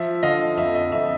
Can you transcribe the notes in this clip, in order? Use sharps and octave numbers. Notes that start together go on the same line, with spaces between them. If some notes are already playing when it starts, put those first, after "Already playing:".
Already playing: F3 E5
D3 D#5 F5
F2 E5
D#5
F2 E5